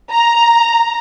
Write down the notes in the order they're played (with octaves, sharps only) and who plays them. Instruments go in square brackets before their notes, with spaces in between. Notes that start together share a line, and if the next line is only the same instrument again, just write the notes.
[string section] A#5